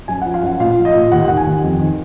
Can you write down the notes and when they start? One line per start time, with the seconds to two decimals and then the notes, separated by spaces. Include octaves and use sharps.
0.08 F#2 G#5
0.22 F3 F#5
0.34 F5
0.42 F#2 F#5
0.59 A#2 F5
0.77 F3
0.85 D#5
0.94 A#2
1.12 D#2 F#5
1.28 D#3 F#5
1.37 G#5
1.46 D#2
1.62 F2
1.79 D#3